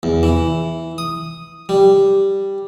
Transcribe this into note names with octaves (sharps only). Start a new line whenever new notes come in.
E2
E3
D#6
G3